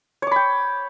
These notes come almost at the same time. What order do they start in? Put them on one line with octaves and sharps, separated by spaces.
C#5 D6 B5 G5